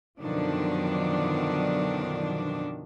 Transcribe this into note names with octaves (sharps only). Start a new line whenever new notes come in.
F#2 B2 D3 D#3 F3 D4